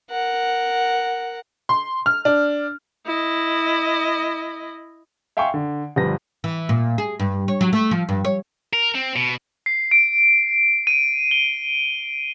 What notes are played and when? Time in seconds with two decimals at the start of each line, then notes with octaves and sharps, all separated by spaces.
0.10 A#4 F#5
1.69 C6
2.06 F6
2.25 D4
3.06 E4 D#5
5.37 E5 F5 G5 G#5 C6 C#6
5.54 D3
5.96 G1 F3 G3 B4 A#6
6.44 E3
6.69 A#2
6.98 G#4
7.19 G2
7.48 C#5
7.61 F#3
7.73 A3
7.91 F3
8.09 G2
8.25 C#5
8.73 A#4
8.95 C4
9.16 B2
9.66 C7
9.91 D7
10.87 D#7
11.31 G7